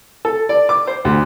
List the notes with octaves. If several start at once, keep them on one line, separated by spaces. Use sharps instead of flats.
A4
D5
D6
C5
D2